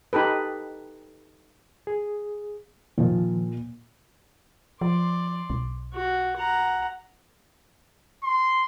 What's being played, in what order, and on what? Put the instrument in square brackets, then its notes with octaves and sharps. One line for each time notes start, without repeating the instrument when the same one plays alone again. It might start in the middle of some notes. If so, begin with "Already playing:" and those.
[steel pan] D#4 G4 A4 B4
[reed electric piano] G#4
[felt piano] A#2 [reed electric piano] D#3 F3
[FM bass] F3 [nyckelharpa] D5 C6
[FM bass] B1
[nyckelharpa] F#4
F#5 A#5
[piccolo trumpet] C6